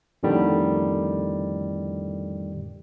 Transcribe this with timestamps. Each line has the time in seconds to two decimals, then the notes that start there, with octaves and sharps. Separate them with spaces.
0.23 F2 A2 D3 D#3 G3